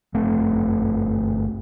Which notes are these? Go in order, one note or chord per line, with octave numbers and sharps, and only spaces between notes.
G1 A3 C4